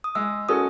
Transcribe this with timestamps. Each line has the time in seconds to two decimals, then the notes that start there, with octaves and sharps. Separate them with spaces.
0.04 D#6
0.15 G#3 E6
0.49 C#4 F#4 A4 D#6